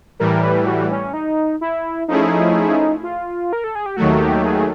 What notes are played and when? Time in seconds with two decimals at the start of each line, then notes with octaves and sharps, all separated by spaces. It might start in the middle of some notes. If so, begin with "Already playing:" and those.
0.19 A2 E3 G3 A#4
0.43 B4
0.66 F#4
0.91 C#4
1.13 D#4
1.61 E4
2.08 F3 A3 C#4 D#4 E4 G#4
3.03 F4
3.53 A#4
3.64 A4
3.75 G#4
3.86 G4
3.97 D#2 D#3 F#3 A3 F#4
4.21 G4
4.45 G#4